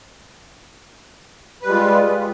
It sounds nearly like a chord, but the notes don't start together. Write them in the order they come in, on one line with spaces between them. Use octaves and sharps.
B4 G3 G#3 F4